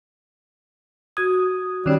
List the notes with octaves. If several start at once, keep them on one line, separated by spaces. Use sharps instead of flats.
F#4 D#6 G#6
D#3 G3 C#4